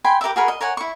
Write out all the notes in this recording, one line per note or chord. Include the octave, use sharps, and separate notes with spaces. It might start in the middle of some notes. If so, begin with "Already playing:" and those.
G5 G#5 B5 C6
G4 A#4 B4 E5
F#4 G#4 A#4 B5
D#5
A#4 C#5 F#5 G#5
E4 C#6